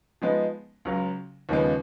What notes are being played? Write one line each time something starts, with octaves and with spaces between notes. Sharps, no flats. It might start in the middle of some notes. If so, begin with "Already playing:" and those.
F3 G#3 B3 D#4
C#2 C#3 F#3
D#2 C#3 F3 G#3 B3